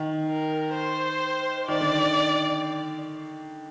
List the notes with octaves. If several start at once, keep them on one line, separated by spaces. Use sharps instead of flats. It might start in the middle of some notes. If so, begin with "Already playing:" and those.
Already playing: D#3
A#4
C5
D#3 D5
D3
D#3